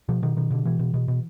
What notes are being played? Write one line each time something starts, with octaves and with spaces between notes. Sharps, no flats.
B2 F3
B2 D#3
B2 D#3
B2 D3
B2 E3
B2
B2
B2